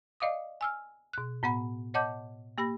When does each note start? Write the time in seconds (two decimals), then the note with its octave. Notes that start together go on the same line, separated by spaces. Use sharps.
0.20 D5 D#5 F5 D6 D#6
0.61 G#5 E6 F6
1.13 B2 F#6
1.43 A2 B3 F#5 B5
1.94 C#5 D#5 F#5 A5 D6 G6
2.58 A#3 G4 B5 A#6